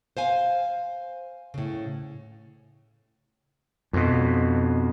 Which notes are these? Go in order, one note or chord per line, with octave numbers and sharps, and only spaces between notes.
C5 F5 G#5
A2 C#3
F2 B2